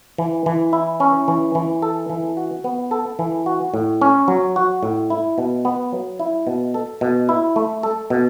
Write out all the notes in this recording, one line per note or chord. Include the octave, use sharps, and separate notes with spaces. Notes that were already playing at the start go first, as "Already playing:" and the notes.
E3
E3
E4
C#4
E3
E3
A4
E3
F#4
B3
A4
E3
F#4
A2
C#4
F#3
F#4
A2
E4
B2
B3
F#3
E4
B2
A4
B2
E4
A3
A4
B2